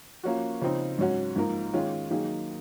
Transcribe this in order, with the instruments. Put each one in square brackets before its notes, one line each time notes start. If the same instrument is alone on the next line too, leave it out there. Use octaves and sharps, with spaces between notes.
[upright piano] F3 A#3 C#4 F#4
C#3 F3 C4 D#4
G#2 F#3 C#4 F#4
G#2 F3 A#3 D#4 A#4
D#3 G#3 C#4 F4
D#3 F#3 A#3 D#4 G#4